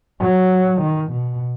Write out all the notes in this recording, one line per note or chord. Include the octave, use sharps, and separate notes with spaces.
F#3
D#3
B2